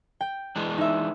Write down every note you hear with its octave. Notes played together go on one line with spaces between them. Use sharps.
G5
E3 G#3 D4
D#4 E5